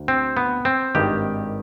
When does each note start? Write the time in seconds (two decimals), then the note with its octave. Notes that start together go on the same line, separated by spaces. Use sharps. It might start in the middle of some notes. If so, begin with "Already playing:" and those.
Already playing: D2
0.08 C4
0.37 B3
0.65 C4
0.95 G#1 G2 D#3 G4